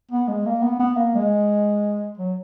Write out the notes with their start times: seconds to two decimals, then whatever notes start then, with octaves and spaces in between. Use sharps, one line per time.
0.11 B3
0.28 G#3
0.46 A#3
0.63 B3
0.80 B3
0.97 A#3
1.15 G#3
2.18 F#3